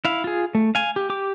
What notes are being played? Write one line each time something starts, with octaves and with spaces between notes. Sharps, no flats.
E4 F5
F4 G#4
A3
F5 G#5
G4
G4 D6